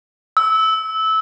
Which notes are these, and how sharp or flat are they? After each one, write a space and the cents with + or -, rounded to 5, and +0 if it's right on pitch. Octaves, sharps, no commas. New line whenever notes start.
E6 -20